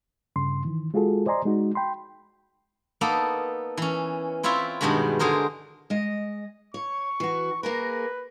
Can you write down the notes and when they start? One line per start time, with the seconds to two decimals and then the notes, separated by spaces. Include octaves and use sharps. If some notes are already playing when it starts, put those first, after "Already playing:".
0.36 G2 C#3 C6
0.65 D#3 E3
0.94 G#3 F4 F#4 G#4 A4
1.26 C5 D5 D#5 G#5 A#5 C6
1.45 G#3 D#4 F#4
1.75 G5 B5 C6
3.01 A#3 B3 D#4 A4
3.77 E3 C#4
4.43 C4 E4 F4 B4 C#5 E5
4.81 G2 B2 D#3 G#3 F#4 B5
5.19 D3 G#3 G#4 A#4 C5
5.90 G#3 D#5
6.74 C#5 C#6
7.20 E3 F#4
7.63 A#3 G#4 A#4 B4